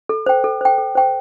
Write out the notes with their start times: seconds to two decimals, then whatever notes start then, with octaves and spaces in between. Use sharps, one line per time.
0.09 A4
0.26 C5 G5
0.44 A4
0.61 C5 G5
0.78 A4
0.95 C5 G5